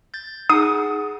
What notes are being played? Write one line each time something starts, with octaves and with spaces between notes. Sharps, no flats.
G6 A6
D#4 G#4 F#5 A#5 D#6